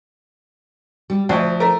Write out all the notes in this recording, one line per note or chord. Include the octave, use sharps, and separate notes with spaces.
G3
D2 F3
A3 A#4